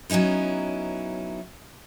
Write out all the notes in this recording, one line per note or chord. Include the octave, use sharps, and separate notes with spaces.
F#3 B3 C#4 D#4 E4